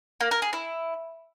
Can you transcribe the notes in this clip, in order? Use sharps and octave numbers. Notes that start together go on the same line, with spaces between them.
A#3
A#4
G#4
E4